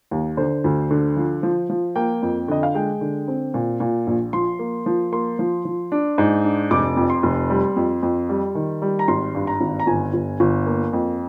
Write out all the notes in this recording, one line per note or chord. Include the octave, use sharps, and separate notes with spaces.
D#2
D3 C5
D2
D3
F3
F3
F3
A#3 G5
F2
D3 D#5
F5
G#3 G5
D3
C4
A#2
A#2
A#1
F3 C6
A#3
F3
A#3 C6
F3
F3
D4
G#2
D4
F1 D6
F2
C6
F1
G3
F2
F2
G3
D#3
G3
A#5
G#1 C6
G2
A#5
G#1
A#5
G1 G#5
G1
G1
A#3
F2